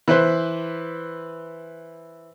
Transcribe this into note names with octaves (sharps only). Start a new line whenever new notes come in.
E3 B4 C5